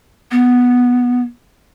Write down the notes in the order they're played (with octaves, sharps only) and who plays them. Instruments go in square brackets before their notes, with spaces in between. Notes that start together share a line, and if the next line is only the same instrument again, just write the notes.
[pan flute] B3